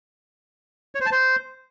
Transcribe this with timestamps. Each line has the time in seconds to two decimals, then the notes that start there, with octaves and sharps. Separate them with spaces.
0.95 C#5
1.00 C5
1.06 A5
1.12 C5